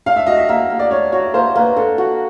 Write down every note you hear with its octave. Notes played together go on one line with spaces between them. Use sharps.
D4 F5
E5
F#4 D#5
E5
A#3 E5
A#3
D5
D4 C#5
F#4 C#5
A#3 C5
A#3 B4
D4 A4
F#4